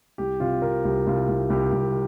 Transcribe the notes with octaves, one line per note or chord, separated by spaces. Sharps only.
C2 G4
C3 F4
C3 A#4
C2 G4
C2 F4
C2
C2 G4
C2